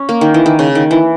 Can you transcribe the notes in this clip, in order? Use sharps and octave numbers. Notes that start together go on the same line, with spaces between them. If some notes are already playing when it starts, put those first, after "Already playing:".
Already playing: C#4
A#3
D#3
E3
D#3
C#3
D#3
E3